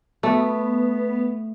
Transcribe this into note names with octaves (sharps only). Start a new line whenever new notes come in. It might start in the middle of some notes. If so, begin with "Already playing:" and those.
A3 B3